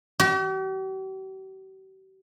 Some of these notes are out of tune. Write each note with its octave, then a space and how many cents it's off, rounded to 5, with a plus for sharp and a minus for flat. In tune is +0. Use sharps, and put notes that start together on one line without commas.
G4 -45